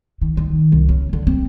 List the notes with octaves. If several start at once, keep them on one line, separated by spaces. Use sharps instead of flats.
D#3
D#3
C2
C#3
D3
C4